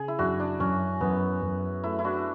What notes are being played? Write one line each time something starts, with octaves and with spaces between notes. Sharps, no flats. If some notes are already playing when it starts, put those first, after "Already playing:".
Already playing: C#3 G#4
E4
F#2 D4 F#4
D4
F#2 C#4
F#2 B3
F#2
A3 E4
E4
D4 F#4